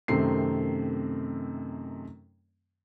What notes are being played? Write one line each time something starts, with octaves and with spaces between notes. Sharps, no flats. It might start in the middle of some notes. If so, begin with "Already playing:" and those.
F#2 C3 D#3 A3 C4 C7